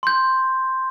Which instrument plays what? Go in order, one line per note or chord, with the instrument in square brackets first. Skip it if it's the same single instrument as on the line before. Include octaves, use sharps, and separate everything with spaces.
[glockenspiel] C6 G6